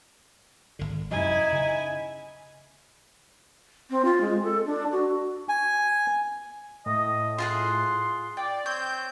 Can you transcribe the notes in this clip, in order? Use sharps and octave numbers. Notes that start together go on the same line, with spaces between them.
G#1 D3
F#2 C3 F#3 D#4 E4 G#5
C#3
C4
F4
G#3
A4
D4
F#4
G#5
A2 D#5
F4 G#4 F#5 C6
D5 G5
C4 C#5 G6